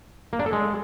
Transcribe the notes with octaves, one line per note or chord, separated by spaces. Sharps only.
A#3
D4
A4
G#3